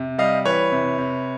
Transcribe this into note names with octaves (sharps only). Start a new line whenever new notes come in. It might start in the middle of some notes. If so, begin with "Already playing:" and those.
Already playing: C3
G3 D#5 F5
E3 B4 C#5
C3
C3